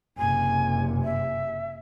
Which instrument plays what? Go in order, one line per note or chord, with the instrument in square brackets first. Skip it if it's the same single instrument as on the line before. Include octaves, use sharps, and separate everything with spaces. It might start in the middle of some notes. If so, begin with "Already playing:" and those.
[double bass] F#1 C3 [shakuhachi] G#5
[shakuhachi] E5